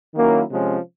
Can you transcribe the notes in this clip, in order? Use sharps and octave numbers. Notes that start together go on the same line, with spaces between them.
D#3 F#3 A#3 C#4 E4
C3 F3 G#3 C#4